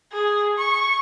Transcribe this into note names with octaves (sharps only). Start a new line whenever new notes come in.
G#4
C#6